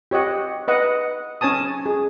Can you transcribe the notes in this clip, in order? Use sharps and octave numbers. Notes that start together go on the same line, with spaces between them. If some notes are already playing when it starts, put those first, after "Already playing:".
G4 C#5 D#5 F#5
B4 D#5 F#5
C#4 C#5 G#5 A5 D#6
G#4